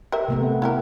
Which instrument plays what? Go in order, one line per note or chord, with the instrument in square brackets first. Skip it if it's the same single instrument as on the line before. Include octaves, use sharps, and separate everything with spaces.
[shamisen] G4 A#4 E5
[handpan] C3 A3 B3
[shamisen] E4 G4 A#4